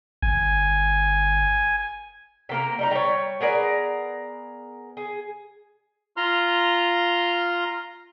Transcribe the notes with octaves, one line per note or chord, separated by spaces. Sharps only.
G1 G#5
C3 A#3 A#4
G3 D#4 A#5
G3 C#5
B3 G#4 A#4 D5
G#4
F4 A#5 C6 F6